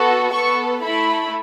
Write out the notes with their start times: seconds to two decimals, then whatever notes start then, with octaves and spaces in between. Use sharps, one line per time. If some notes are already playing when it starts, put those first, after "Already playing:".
Already playing: B3 F#4 A4
0.33 B3 A4 C#6
0.83 A3 E4 A4 B5